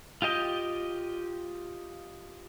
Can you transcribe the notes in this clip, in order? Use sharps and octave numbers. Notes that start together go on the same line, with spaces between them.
F4 G4 D#5 G5